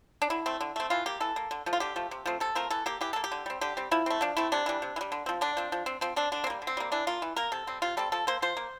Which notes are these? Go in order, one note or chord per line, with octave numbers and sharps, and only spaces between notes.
D4
D3 E4
A3 C4
D3
A3 C4
E3 F4
A#3 G4
E3 A4
A#3
D3
F3 A3
F4
D3 G4
F3 A3
C3
F3 A3 C4
C3 A4
F3 A3 C4 A#4
E3 A4
A#3 G4
E3 G4
A#3 A4
G4
D3
G3 C4
D3 G4
G3 C4
F3 E4
A3 C4
F3 D4
A3 C4 E4
C3 D4
E3 G3
C3
E3
G3
D3
F3 C4
D3 D4
F3 C4
F3
C4
F3 C4
C4 D4
D3 D4
C4
G3 A#3
D3
C4
G3 A#3
E3 D4
A#3 F4
E3
A#3 A#4
C3 A4
G3 C4
C3 F4
G3 C4 A4
F3 A4
A#3 C5
F3 C5
A#3